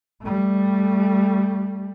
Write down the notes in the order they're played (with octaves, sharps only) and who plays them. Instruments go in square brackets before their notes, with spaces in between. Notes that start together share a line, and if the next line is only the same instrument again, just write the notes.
[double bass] G3 A3